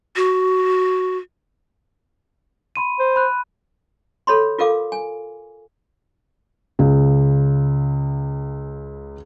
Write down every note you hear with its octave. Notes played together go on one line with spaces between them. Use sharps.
F#4
B5 C6 D#7
C5
B5 F#6
A4 C#5 B5 C6
F4 A4 A#4 F5 D6
G#5
C#2 C#3